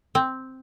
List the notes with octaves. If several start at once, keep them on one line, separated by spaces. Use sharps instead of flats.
C4